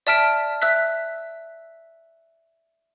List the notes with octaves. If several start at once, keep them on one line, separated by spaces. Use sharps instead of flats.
D5 E5 A5 F6 B6 D7
E5 E6 F#6 B6